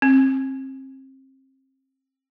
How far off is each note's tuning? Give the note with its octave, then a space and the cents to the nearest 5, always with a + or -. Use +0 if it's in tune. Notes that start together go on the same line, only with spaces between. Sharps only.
C4 +30